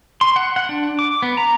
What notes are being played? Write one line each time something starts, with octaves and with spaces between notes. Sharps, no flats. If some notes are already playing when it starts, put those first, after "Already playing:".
C6
F#5
F#5
D4
D6
B3
A#5